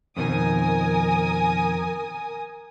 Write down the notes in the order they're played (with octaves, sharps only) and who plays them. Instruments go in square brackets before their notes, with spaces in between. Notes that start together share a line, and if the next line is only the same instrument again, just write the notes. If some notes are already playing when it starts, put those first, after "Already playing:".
[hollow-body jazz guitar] F2 B2 D#3 [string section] A#4 G#5 D#6